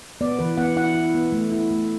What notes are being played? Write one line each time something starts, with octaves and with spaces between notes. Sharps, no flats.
B3 D5
E3 B4
B3 F#5
E4 F#5
E4
B3
A3
E4
A3